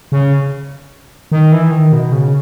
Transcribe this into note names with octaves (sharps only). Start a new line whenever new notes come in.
C#3
D#3
E3
D#3
B2
C#3